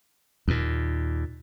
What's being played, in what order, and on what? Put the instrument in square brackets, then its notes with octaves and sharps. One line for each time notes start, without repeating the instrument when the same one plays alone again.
[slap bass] D#2 A#2